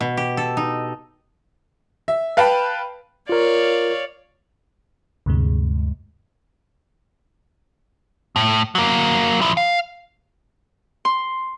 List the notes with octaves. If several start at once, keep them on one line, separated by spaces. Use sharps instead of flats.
B2
G4
A4
D#4
E5
B4 F5 G5 A5 B5
F4 A#4 C#5 D5 F5
D2 G2 C3 G#3
A2
F#3 A#3
F3 E4
F5
C6